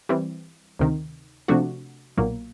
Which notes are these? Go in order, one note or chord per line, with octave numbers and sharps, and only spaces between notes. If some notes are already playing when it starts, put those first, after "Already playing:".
E3 G3 C4
D2 C3 D#3
C3 F3 A3 D4 F#4
B1 A#2 F#3 A#3